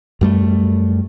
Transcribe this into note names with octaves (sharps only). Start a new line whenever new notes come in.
F#2 G3 A3